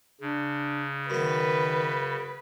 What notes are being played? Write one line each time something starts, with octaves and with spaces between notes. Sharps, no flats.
C#3 D4
F#2 D#3 B3 B4